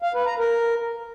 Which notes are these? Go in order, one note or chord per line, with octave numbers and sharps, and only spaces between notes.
F5
B4
A#5
A#4